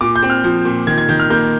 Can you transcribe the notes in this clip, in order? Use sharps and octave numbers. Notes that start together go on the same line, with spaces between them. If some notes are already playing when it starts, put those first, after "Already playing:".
A#2 D6
G6
C4
F6
F3
A#2
D#3 G#6
G#6
D#3 G6
F6
A#3 G6